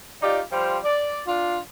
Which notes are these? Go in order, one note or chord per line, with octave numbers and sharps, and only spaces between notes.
D#4 F4 G4 D5
F3 G3 F4 C5 G5
D5
D4 F4